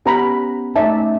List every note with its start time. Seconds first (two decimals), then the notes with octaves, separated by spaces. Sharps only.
0.06 B3 C#4 G4 A#5 B5
0.76 A3 C#4 D#4 D5 E5 A5